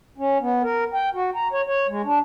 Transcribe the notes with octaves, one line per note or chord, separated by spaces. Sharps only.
C#4
B3
A#4
G5
F#4
A#5
C#5
C#5
G#3
D4